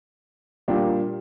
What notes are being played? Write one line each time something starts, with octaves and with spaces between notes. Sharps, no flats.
A#2 G3 A#3 D4 G4